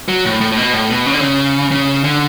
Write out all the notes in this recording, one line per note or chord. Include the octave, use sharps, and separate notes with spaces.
F#3
A2
A2
A2
B2
A2
B2
C#3
D3
C#3
C#3
D3